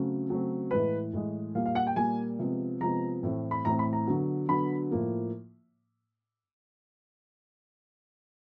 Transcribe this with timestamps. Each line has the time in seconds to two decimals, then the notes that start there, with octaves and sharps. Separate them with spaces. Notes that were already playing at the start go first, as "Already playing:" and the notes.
Already playing: C#3 F#3 A3 C4
0.30 C#3 F#3 A3 C4
0.71 A2 E3 G#3 B4
1.13 A2 E3 G#3
1.55 A#2 G3 A#3 F5
1.66 F5
1.75 F#5
1.87 G5
1.96 A#2 G3 A#3 G#5
2.39 C3 F3 G#3 B3
2.81 C3 F3 G#3 B3 A#5
3.23 A2 E3 A3 C4
3.51 B5
3.65 A2 E3 A3 C4 A#5
3.79 B5
3.93 A#5
4.07 D3 F#3 B3
4.48 D3 F#3 B3 B5
4.91 A2 F3 A#3